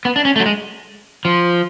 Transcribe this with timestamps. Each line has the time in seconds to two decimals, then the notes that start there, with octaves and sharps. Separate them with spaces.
0.05 B3
0.16 D4
0.25 C#4
0.36 A3
0.40 F#3
0.46 G#3
1.25 F3